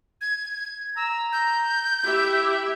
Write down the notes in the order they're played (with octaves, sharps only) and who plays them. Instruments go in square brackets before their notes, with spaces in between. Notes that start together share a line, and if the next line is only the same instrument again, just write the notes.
[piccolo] G#6
[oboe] A#5 [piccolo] E6
[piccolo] G6
[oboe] E4 [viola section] G4 E5